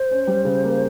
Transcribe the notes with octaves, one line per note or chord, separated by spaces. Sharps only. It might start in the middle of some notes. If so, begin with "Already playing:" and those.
Already playing: C5
C#4
G3
C#3
A#3